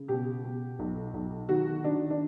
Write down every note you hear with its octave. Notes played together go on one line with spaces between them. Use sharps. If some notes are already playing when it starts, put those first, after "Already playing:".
Already playing: C#3
B2 G4
B2
B1
B1
D#3 F#4
D#3 D4
D4